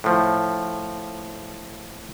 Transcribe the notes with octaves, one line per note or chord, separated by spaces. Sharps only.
A2 F3